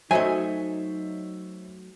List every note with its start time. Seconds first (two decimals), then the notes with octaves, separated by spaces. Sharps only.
0.11 F#3 A3 D#4 C5 C#5 D#5 E5 G#5